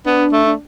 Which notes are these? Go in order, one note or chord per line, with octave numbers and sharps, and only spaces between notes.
B3 D4
A3
D4